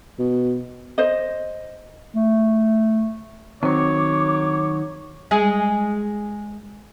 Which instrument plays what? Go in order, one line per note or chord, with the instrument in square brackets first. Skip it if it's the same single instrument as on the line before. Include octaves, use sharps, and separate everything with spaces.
[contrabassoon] B2
[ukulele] C5 D#5
[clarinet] A3
[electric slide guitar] D#3 F#3 [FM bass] C4 [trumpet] C#5 [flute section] D6
[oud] G#3 G#4